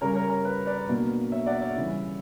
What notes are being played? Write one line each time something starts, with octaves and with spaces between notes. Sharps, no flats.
C#3 G3 C#4 A#4 C#5
A#4 C#5
A#4
B4
B4 D5
B2 F#3 A#3 D4
C#5 E5
D5 F#5
C#5 E5
C#3 E3 G3